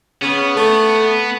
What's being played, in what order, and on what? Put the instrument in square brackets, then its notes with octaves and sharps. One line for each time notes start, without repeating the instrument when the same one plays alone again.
[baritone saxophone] C#3 [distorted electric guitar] B3
[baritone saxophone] A3